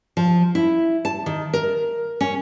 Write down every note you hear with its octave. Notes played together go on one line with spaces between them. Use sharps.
F3
E4
A5
D#3
A#4
C#4